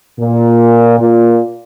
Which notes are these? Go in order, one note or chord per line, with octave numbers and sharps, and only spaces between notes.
A#2
A#2